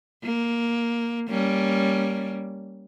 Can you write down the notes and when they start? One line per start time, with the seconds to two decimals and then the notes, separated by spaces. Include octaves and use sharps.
0.24 A#3
1.29 G3 A#3 C#4